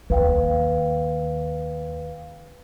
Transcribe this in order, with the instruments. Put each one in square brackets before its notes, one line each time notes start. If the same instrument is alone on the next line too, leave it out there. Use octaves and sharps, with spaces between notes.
[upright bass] D#2 [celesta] B4 F5 G5